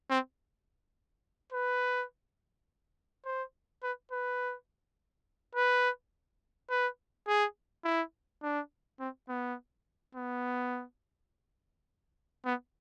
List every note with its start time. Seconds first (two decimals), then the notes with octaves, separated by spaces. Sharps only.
0.10 C4
1.53 B4
3.26 C5
3.83 B4
4.12 B4
5.55 B4
6.70 B4
7.27 G#4
7.85 E4
8.43 D4
9.00 C4
9.29 B3
10.15 B3
12.45 B3